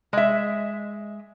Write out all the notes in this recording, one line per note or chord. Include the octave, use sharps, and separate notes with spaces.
G#3 E5